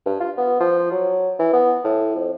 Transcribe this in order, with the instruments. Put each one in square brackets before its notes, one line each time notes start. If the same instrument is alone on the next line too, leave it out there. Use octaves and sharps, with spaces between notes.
[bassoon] G2
F4
B3
F3
F#3
E3
B3
A2
F2